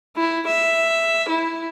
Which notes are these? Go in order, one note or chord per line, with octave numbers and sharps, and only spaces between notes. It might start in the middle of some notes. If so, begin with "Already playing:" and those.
E4
E5
E4